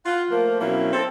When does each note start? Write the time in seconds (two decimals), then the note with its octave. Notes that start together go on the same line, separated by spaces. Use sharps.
0.06 F4 F#5
0.31 F3 A3 A#3 F4 A#4 C5
0.60 B2 F#3 A#3 C4 C#4 E4
0.93 C4 A4